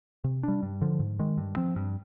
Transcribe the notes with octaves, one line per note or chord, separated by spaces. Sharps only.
C3
G3 D4
G2
D3 F3
G#2
D#3 G#3
G2
F3 C4
G2